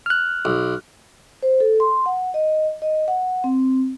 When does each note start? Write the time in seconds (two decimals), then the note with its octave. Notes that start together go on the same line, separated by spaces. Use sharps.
0.06 F6 F#6
0.45 B1
1.43 C5
1.60 A4
1.80 C6
2.06 F#5
2.34 D#5
2.82 D#5
3.08 F#5
3.44 C4